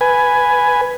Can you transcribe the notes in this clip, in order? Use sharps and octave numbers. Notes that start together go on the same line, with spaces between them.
B4 G#5